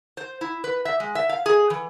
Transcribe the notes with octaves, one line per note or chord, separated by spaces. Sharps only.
C5
E4
B4
E5
G#3
E5
F5
G#4
E3